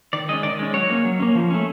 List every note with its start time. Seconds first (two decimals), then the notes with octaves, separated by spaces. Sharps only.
0.13 D#3 D5
0.29 G#3 D#5
0.33 C#4
0.43 D#3 D5
0.59 G#3 C#4
0.74 F#3 C#5
0.90 A#3 C#4
1.05 F#3
1.20 A#3 C#4
1.35 F3
1.51 A3 C#4